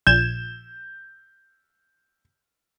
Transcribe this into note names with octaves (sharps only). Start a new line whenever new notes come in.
A#1 G6 G#6 E7